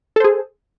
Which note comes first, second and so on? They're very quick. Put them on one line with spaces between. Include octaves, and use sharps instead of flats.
A4 C5 G#4